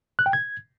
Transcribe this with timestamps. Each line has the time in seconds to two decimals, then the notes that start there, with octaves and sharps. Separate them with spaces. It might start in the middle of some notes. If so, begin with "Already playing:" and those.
0.19 F#6
0.26 G5
0.33 G#6